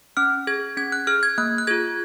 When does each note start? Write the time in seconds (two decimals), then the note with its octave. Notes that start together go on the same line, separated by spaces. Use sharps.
0.17 C#4 F6
0.47 G#4 G#6
0.77 C#4 G#6
0.92 F#6
1.07 G#4 F6
1.23 G#6
1.38 A#3 F#6
1.58 F#6
1.67 F4 G#4 G#6